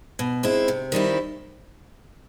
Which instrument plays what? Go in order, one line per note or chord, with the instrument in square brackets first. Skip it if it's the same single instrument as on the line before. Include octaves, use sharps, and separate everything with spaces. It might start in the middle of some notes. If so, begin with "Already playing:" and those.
[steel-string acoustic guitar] B2
G#3 C4 E4
C3
D#3 G3 C4 E4